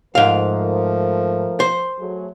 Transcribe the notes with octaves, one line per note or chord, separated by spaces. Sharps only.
G#2 F3 A3 A#4 F5
C5
F#3 A3 G#4